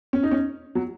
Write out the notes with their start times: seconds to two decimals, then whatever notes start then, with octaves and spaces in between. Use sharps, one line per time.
0.13 C#4
0.23 D#4
0.31 C#4
0.75 F#3